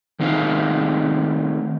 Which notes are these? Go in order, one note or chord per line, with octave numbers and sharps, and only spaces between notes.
D#3 A3 C4 D#4 E5 F5